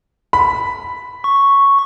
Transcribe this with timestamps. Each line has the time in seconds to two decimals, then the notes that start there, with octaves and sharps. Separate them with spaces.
0.33 B5
1.24 C#6